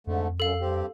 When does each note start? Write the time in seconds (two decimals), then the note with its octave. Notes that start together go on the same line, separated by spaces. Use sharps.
0.07 F2 G#2 D3 A3
0.40 F#2 A4 F5
0.61 G2 C4 G4